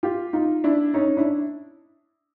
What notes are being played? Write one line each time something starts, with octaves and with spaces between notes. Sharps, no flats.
F4 G4
D#4 F4
D4 E4
C#4 D#4
D4 E4